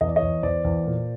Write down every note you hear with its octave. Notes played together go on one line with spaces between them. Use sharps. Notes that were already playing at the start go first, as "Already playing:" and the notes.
E2 D#5
D5
C#5 D#5
E2
E2 C5 D5
E2
A#2